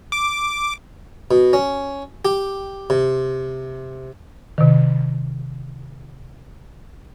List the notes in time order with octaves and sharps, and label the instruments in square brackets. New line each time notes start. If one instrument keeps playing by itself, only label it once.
[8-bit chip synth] D6
[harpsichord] B2
C#4
G4
C3
[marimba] C3 D#3